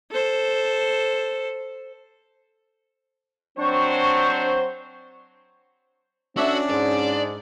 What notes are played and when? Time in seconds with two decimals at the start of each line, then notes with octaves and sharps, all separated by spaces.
0.11 A4 C5
3.58 F#3 C4 D4 C5 C#6
6.37 C#4 D4 F#4 A4 C#5 E5
6.70 G#2 D5